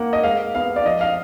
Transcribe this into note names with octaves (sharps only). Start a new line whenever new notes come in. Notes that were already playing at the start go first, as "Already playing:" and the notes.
Already playing: A#3 F#5
D#5
G#3 F5
B3 F5
D5
F3 D#5
F5